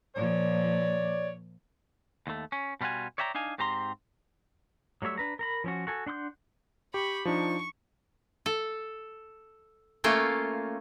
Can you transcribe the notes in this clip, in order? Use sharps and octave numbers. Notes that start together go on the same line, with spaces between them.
A#2 F3 C#5 D5
D#2 A3
C#4
B2 G3 F4 F#4 G#5
C#5 D5 E5 G5 A#5
D4 D#4 F5 G#5
G#2 C4 G4 A#5 C6
F#3 G3 A3 C#5 E5
D4 B4 A#5
A#4 A#5 B5
F3 C#4 F#4
F#4 A4 G#5
D4 F#5 C6 D6 G6
G4 B5 C#6
F3 D4 D#4 C#6
A4
A3 A#3 C#4 F4